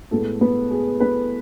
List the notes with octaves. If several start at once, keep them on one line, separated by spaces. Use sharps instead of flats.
A2 G#3 B3 A4
B3 B4
G#4
B3 B4